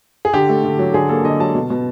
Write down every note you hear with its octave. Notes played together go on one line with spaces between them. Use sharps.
G#4
D3 G4
A3
D3
F#3
D3 G#4
A#3 A4
D3 D#5
F#3 A5
B2
B2